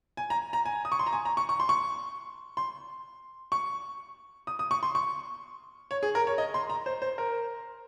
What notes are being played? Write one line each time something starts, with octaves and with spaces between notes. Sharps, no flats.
G#5
A#5
A#5
G#5
D#6
C#6
C6
A#5
G#5
A#5
C#6
C#6
C6
C#6
C6
C#6
D#6
D#6
C#6
C6
C#6
C#5
G#4
A#4
C#5
D#5
C6
A#5
C5
C5
A#4